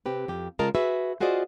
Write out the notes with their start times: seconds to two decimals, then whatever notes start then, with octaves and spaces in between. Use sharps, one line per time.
0.06 C3 C4 G4 B4
0.28 F2 G4
0.59 C#3 G#3 F4 A#4 D#5 A5
0.75 F#4 G#4 B4 E5
1.20 F4 F#4 G#4 C5 D5 D#5